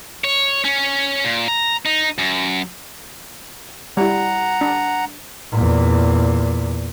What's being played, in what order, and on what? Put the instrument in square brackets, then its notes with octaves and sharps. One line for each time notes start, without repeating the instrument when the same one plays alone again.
[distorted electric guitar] C#5
C#4
A#2
A#5
D#4
F#2
[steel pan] G3 E4 [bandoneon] F#5 A#5
[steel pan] D4
[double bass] E2 A#2